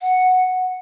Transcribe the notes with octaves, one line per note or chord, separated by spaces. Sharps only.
F#5